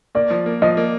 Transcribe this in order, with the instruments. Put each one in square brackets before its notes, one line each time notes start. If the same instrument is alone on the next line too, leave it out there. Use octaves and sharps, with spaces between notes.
[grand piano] A#3 [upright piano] D5
[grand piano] F3
A#3
[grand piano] F3 [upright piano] D#5
[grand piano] A#3